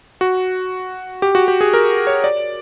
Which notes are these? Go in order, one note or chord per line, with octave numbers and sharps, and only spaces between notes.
F#4
G4
F#4
G4
G#4
A#4
C#5
D5